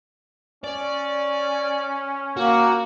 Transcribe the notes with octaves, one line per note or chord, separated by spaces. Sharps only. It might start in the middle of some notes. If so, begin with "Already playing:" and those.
C#4 D5
A#3 F#4